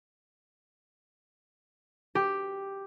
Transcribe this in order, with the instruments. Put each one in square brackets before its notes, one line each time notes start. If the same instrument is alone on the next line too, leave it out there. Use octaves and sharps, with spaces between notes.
[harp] G4